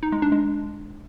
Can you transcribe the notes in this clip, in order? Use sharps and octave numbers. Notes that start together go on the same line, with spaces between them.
D#4
G#3
D4
G#3